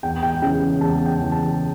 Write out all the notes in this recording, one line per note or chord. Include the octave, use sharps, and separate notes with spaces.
E2 G5
G5
C#3 E3 G5
E2 A5
G5
C#3 E3
A5